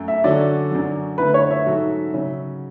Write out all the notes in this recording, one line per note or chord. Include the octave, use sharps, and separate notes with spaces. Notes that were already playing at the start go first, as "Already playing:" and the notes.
Already playing: F#2 A3
E5
D3 F#3 C#4 F#4 A4 D5
F#2 D3 F#3
D3 A3 E4 B4
C#5
E5
G#2 F#3 C#4 F#4 A4
C#3 F#3 C#4